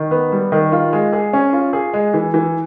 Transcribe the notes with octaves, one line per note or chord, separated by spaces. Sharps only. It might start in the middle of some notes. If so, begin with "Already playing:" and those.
Already playing: D#3
B3
G3
D#3
F4
G#3
G#4
C#4
F4
G#4
G#3
E3
E3